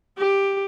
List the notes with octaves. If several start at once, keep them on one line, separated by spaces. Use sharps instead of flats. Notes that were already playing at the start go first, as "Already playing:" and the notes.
G4